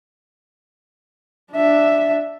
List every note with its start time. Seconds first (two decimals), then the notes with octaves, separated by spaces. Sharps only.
1.52 D4 E5